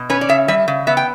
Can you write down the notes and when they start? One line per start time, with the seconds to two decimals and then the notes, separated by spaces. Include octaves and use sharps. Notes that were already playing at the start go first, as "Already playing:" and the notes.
Already playing: B2
0.10 C#4 B4
0.21 D5
0.29 C#3 E5
0.48 G3 E5
0.68 C#3
0.87 B3 E5
0.97 G5